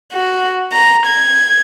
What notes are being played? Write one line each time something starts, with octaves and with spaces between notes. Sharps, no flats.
F#4
A#5
G#6